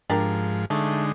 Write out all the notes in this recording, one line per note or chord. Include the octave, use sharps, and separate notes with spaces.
G#2 F3 D4 G4 A#4
D3 G#3 A3 D#4